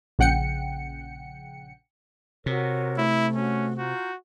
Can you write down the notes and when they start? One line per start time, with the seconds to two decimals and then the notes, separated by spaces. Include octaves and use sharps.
0.19 A#1 C#3 F#5 G5 C#7
2.46 C3 F#4 A#4 C#5
2.98 A3 E4
3.35 C#4 F#4
3.78 F4 F#4 A#5 G6